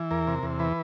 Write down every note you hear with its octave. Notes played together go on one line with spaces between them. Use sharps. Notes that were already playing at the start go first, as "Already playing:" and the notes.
Already playing: E3
E2 A#4
C3
E2
E3 B4